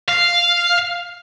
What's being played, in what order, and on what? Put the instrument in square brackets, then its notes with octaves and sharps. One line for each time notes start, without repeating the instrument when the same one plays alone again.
[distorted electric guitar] F5